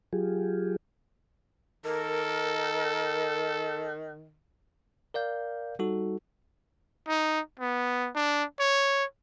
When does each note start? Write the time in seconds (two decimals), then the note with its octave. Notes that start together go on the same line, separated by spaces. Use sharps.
0.13 F#3 F4 G4 G#4
1.85 D#3 A4 A#4
5.14 A#4 D5 F5 G6
5.79 G3 D#4 F#4 A4
7.08 D#4
7.59 B3
8.15 D4
8.59 C#5